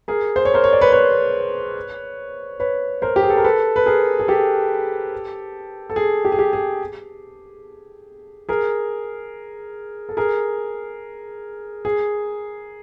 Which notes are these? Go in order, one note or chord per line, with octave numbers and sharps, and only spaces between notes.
G#4 A#4
C5
C#5
A#4 C5
C#5
D5
B4 C#5
B4 C#5
B4 C#5
A#4 C5
G4
G#4
A4
A#4
A4 B4
B4
G#4 A#4
G#4
G4 A4
A4
G#4
G4
G#4
G4
G#4
G#4 A#4
A4
G#4 A#4
G#4